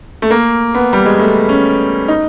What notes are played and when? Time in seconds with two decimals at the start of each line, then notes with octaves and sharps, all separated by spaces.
0.22 A3
0.30 A#3
0.75 B3
0.93 G3
1.06 G#3
1.19 A3
1.49 C#4
2.08 D#4